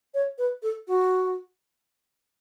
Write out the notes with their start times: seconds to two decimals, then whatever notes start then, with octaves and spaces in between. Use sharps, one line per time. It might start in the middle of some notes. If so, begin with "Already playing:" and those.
0.14 C#5
0.38 B4
0.63 A4
0.87 F#4